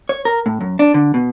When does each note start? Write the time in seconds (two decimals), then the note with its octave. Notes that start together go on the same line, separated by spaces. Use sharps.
0.09 C#5
0.25 A#4
0.46 A2
0.61 F#2
0.79 D4
0.94 D3
1.14 B2